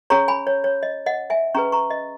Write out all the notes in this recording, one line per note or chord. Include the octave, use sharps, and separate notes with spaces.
C#4 G#4 C#5 A#5 C#6
G#5 B5
C#5
C#5
D#5
D#5 F#5
E5 G#5
C#4 G#4 B4 A#5 C#6
A#5 C#6
D#5